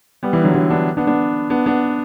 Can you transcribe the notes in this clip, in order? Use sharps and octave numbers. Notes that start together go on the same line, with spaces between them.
G3 B3
E3 G3
D3 F#3
D3 F#3
B3 D4
B3 D4
B3 D4
B3 D4
B3 D4